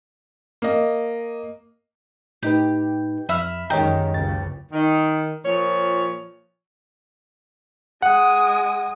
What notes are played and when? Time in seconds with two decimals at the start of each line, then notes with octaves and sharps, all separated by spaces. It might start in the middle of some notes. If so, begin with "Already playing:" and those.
0.62 A#3 D#5
2.43 A2 D#4 G4 B4
3.29 F2 E5 B5 F6
3.70 F#2 D#3 G#3 G4 C#5 D#5 A#5
4.14 F#1 C#2 C#3 A6
4.72 D#3
5.45 A#2 F3 C#5
8.02 G#3 F#5 D#6